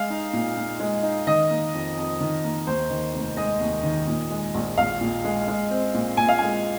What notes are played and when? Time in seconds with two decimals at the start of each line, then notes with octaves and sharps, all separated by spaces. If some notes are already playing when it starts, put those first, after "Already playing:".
Already playing: G#3 F5
0.10 D#4
0.33 A#2
0.57 A#2
0.80 G#3
1.03 D#4
1.27 D#3 D#5
1.50 A#3
1.74 F2
1.97 F2
2.21 D#3
2.44 A#3
2.67 D#2 C5
2.90 D#3
3.13 F1
3.37 G#3 D#5
3.60 D#2
3.83 D#3
4.07 A#2
4.31 G#3
4.54 A#1
4.78 A#1 F5
5.01 A#2
5.25 G#3
5.48 G#3
5.71 C4
5.94 A#2
6.17 A#2 G#5
6.29 F5
6.38 G#3 G#5